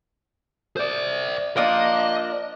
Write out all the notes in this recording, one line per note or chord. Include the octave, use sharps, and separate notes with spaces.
C5 D5
F3 A#3 D4 D#5